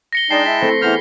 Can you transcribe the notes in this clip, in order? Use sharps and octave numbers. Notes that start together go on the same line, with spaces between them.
A#6 C#7 G7
G#3 D4 D#4 G5 A5 A#6 C7
E4 B6
A3 C4
E3 B3 G#4 C5 B5 F6 A#6